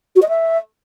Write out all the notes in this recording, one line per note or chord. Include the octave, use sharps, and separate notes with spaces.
F#4
D#5
E5